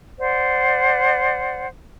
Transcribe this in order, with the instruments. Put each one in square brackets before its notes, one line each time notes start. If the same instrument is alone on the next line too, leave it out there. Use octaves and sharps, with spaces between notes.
[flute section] C5 D5 F#5